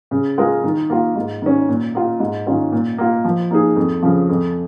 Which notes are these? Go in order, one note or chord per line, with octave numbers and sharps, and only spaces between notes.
C#3
G#3 F4 A#4
D#3
A#3 F4
G#2
D#3 C#4
A#2
A#3 F4
G#2
D#3 C#4 F4
A#2
A#3 F4
F3
A#3 D#4 G#4
F2
C#3 F3
F2